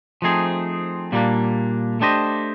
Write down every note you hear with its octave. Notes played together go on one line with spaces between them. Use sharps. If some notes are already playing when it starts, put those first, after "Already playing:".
F3 A3 C4 D#4 G#4
A#2 G3 A#3 D4
A3 D4 G4 C5 D#5